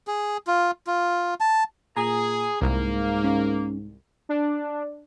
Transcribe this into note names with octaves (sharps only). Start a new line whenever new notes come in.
G#4
F4
F4
A5
A#2 G#4 A#5
C2 G#2 A#3
C#4
D4